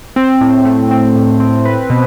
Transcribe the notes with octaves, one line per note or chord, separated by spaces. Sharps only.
C4
A2
A3
C4
A2
C4
B4
B2